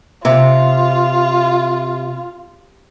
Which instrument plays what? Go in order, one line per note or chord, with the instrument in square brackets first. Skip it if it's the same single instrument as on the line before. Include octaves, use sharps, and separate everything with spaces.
[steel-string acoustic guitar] C3 [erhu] F4